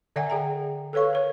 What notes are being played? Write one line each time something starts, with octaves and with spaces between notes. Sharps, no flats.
D3 D5 E5 F#5 G#5
G#4 G5 A#5
A4 B4 C#5 F5 C#6
A#4 C#5